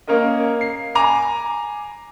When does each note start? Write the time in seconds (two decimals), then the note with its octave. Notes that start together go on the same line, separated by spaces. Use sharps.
0.07 A#3 C#4 A#4 D#5
0.61 C7
0.95 G#5 A#5 D6